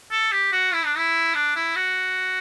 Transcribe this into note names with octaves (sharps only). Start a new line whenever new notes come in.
A4
G4
F#4
E4
D4
E4
D4
E4
F#4